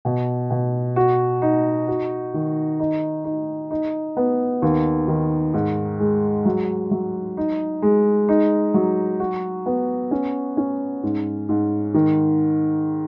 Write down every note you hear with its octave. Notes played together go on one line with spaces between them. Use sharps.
B2
B2
F#4
D#4
F#4
D#3
D#4
D#4
D#4
B3
D#2
D#3
G#2
G#3
F#3
F#3
D#4
G#3
D#4
F#3
F#4
B3
C#4
C#4
G#2
G#2
D#3